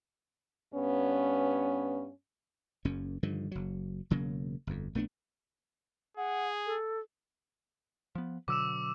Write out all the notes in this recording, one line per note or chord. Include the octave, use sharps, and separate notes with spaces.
G2 B3 C#4
F#1 F#2 C#4
G2 D3 D#3 F3
F#1 F#3
E1 C#3 F#3 A#3
G1 F2
A#1 A3 B3 D4
G#4 F#5
A4
F3 B3
B2 D3 F#3 D6 E6 E7